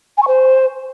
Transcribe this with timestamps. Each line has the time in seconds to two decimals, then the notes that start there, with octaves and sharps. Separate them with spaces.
0.18 G#5
0.23 C#6
0.28 C5